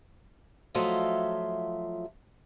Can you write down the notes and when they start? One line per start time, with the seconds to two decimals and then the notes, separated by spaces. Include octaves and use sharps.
0.75 F3 F#3 A3 F4 D#5 E5